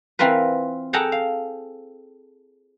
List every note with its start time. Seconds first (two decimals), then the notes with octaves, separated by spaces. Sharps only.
0.19 E3 C4 F4 A#4 B4
0.93 G#4 A4 F#5 G5 A5 A#5
1.12 F5